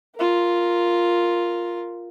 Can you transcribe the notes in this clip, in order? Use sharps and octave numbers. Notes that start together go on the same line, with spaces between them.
F4 A#4